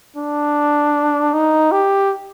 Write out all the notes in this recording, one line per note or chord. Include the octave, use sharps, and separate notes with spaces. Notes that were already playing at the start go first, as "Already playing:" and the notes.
D4
D#4
G4